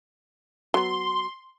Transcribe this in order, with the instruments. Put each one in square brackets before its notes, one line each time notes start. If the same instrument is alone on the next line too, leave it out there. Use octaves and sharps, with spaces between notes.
[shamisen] F#3 B3 [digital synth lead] C6